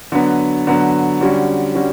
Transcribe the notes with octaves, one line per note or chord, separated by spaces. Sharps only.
D3 F#3 B3
D3 F#3 B3
D3 G3 C#4 F#4
D3 G3 C#4 F#4